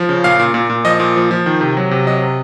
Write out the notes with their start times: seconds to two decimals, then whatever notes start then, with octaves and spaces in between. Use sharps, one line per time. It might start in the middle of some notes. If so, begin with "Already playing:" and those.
Already playing: F3
0.09 C#3
0.24 A#2 F5
0.39 A#2
0.54 A#2
0.70 A#2
0.85 F3 D#5
1.00 A#2
1.16 F3
1.31 F3
1.46 D#3
1.61 C3
1.77 F#3
1.91 C3
2.07 F#3 D#5
2.22 C3